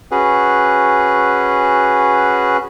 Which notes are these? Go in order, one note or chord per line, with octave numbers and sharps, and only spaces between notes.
C#4 F#4 G#4 B4